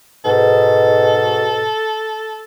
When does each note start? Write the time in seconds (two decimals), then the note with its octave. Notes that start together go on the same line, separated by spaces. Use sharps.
0.25 G#2 B2 A4